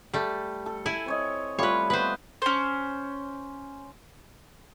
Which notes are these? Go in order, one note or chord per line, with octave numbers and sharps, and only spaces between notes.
G3 A3
A4
E4 G#5
C4 C#5 D#5
G3 A3 F4 B4 C#5
B3 B4 C5
C#4 C5